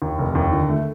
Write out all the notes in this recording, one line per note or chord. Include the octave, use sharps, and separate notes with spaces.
D#2
F1
D#2
D3
A3